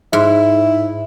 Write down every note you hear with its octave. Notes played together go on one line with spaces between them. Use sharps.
G#2 E4